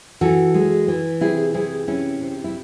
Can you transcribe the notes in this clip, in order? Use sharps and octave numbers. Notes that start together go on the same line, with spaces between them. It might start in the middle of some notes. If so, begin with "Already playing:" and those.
E3 F#4 A4
G#3
E3
C3 E4 G#4
C3 E4 G#4
C3 C#4 E4
C3
E4